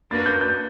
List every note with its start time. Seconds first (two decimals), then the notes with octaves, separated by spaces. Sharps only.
0.11 A#3 D4 F#4 B4 A6
0.26 G6
0.41 G6